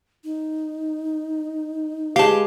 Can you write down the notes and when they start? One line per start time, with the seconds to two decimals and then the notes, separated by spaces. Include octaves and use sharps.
0.24 D#4
2.16 G#3 G4 B4 F5 A5